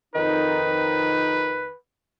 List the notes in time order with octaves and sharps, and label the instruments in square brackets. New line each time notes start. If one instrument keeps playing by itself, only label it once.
[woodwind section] F2 D#3 D#4 [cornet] B4